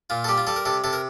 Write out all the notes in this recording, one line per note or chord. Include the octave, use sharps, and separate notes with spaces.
A#2 F4
A4
G3 G4
F4
G3 A4
A#4
C3 A4
C3 A4
A#4